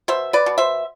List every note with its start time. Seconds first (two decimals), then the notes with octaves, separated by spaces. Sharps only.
0.08 B2 C5 E5
0.33 B4 D5
0.46 B2
0.58 C5 E5